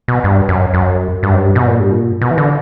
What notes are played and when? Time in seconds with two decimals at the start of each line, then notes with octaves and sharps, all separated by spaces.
0.08 B2
0.24 G2
0.49 F#2
0.74 F#2
1.23 G2
1.33 F#2
1.40 G2
1.55 B2
1.67 A#2
1.80 G2
1.92 A#2
2.21 B2
2.31 E3
2.38 D3